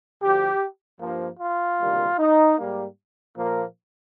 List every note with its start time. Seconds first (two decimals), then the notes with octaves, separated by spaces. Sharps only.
0.22 D2 D3 F3 G4
1.00 G2 F3 A#3
1.39 F4
1.79 D2 C3 D#3 G3 A#3
2.18 D#4
2.57 G#2 G3 A#3
3.36 A#2 F3 A#3